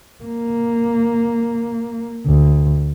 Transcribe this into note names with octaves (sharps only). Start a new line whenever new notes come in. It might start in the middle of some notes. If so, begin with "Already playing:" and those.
A#3
D2